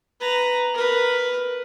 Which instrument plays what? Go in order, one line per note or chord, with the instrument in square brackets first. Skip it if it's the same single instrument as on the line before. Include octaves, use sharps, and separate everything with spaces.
[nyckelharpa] B4 A#5
A#4 B4